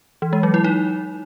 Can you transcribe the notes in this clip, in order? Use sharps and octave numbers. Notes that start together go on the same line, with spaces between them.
E3
G#3
F#3
E4
D#4